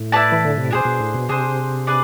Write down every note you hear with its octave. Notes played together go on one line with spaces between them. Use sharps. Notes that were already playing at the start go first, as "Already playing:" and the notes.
Already playing: A2
E4 B4 D5 A5
E3
D3
C3
B2 D4 G#4 C5
B2
A2
B2
C3 D4 G#4 C5
D4 G#4 B4 D5